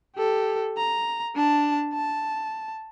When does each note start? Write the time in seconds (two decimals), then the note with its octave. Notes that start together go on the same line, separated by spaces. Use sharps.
0.16 G4 A4
0.77 A#5
1.35 D4 A5
1.94 A5